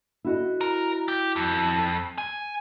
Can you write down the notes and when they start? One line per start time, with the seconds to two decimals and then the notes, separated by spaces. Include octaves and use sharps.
0.24 E4 F#4 D#5
0.61 A#4
1.08 G4
1.36 F2
2.18 G#5